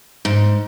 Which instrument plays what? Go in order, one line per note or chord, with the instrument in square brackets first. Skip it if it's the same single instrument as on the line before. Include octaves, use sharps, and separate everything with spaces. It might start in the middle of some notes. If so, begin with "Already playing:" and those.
[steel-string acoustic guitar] G#2